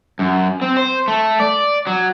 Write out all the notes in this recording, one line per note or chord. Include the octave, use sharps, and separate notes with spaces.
F#2
C4
C5
A3
D5
F#3